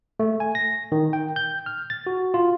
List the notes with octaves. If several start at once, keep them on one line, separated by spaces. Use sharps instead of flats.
A3
G#5
A#6
D#3
G5
G6
F6
A6
F#4
F4